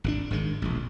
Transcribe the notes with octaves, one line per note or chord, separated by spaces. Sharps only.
G#1 C#3 D4
G#1 D#3 G#3
E1 A#1